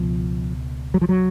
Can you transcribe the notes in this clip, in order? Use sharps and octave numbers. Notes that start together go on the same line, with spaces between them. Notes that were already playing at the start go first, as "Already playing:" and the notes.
Already playing: C#2 B2 F3
F#3
F3
F#3